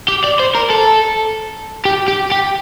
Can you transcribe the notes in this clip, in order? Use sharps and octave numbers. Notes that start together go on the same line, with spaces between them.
G4
D5
C5
A#4
A4
G4
G4
G4